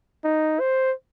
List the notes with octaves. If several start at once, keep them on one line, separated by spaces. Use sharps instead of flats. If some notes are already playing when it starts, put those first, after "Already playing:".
D#4
C5